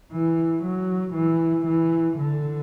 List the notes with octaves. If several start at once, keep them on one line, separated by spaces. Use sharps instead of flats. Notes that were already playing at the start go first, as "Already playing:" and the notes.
E3
F#3
E3
E3
D3